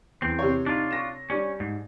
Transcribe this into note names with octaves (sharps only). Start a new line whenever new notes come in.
E2 C4
C3 C#5
D4 D#4 F4
C#6 A#6 E7
G3 C#4 D4
G#2